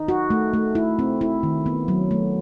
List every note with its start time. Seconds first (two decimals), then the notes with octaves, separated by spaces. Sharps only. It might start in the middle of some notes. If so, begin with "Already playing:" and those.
Already playing: D#4
0.08 F#4
0.30 A3
0.53 A3
0.75 E4
0.99 C4
1.21 E4
1.43 D#3
1.66 B3
1.88 F#3
2.11 A3